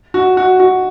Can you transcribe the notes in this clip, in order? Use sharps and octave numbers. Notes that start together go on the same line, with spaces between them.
F#4
F#4
F#4